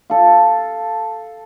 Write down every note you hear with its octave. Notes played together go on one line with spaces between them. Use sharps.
A4 F5